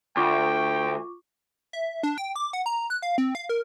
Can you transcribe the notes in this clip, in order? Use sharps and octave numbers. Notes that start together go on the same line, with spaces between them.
D2 F4 G5 C#6 D6
E5
D4
G5
D6
F#5
A#5
F#6
F5
C4
F5
A#4